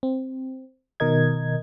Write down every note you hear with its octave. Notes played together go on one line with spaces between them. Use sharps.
C4
B2 D#3 A#4 D#5 G#6